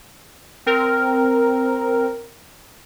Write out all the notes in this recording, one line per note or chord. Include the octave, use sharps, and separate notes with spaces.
C4 A#4